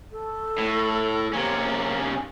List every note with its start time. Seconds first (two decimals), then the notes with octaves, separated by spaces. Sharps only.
0.12 A4
0.58 A2
1.33 C3 A#3 C#4